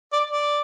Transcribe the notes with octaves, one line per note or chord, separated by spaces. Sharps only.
D5
D5